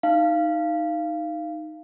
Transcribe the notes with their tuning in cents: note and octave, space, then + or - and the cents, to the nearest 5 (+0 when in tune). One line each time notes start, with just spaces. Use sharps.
D#4 +0 F5 -20